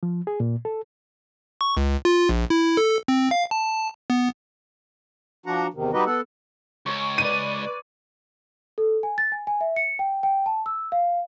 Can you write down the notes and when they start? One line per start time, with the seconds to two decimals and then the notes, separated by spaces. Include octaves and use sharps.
0.03 F3
0.27 G#4
0.40 A#2
0.65 A4
1.61 C#6
1.77 C#2
2.05 F4
2.29 A#1
2.50 E4
2.77 A4
3.08 C4
3.31 F5
3.51 A5
4.10 B3
5.46 F3 D4 F#4 F#5 A#5
5.74 E2 C3 D#3
5.93 G3 D#4 F#4 G4 B4 D#5
6.06 B3 A4 F#5
6.86 C#2 C#5 C#6
7.18 B4 D5 D#7
8.78 A4
9.03 G#5
9.18 A6
9.32 G#5
9.47 G#5
9.61 E5
9.76 C#7
9.99 G5
10.23 G5
10.46 A5
10.66 E6
10.92 F5